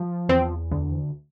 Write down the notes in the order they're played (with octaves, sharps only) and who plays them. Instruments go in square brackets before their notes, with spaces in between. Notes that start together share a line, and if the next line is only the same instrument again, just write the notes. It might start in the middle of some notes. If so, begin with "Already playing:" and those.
Already playing: [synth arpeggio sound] F3
E2 C4
D2